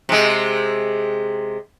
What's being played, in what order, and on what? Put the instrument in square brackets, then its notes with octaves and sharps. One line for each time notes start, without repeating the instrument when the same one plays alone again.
[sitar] C3 G#3